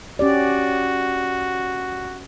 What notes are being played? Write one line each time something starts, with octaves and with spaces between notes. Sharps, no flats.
C#4 F#4 G4 D5